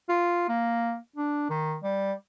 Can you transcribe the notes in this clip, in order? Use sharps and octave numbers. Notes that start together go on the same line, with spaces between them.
F4
A#3
D4
D#3
G3